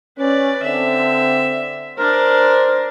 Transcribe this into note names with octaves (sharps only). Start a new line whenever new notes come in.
C#4 B4 D5
D3 C4 E5
D4 A#4 C5